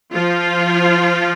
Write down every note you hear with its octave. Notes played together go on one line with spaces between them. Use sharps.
F3 F4